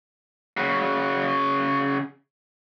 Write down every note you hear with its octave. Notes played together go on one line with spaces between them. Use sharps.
C#3 F#4